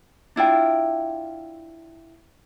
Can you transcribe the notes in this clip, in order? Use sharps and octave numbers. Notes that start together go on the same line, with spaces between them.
D4 E4 F4 G5